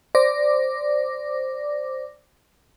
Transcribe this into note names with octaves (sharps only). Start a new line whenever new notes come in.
C5 D5 D6 A#6